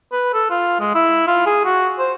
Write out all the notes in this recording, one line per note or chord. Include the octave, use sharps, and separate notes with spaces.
B4
A4
F4
G#3
E4
F4
G#4
F#4
C5